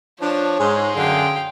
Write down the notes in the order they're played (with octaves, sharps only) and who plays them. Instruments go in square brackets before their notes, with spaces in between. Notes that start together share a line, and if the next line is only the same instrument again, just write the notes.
[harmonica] F3 [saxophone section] D4 [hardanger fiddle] C#5
[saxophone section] G#2 [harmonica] G#4 C6
[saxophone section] F#2 D3 [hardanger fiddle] F5 G5